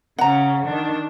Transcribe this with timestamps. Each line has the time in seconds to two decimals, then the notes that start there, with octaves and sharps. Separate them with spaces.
0.18 C#3 C#4 F#5 A#5
0.65 D#3 D4